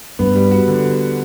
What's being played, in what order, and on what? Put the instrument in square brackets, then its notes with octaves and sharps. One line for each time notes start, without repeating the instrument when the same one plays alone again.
[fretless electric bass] G2 [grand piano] B3
[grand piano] G3
F#4
D3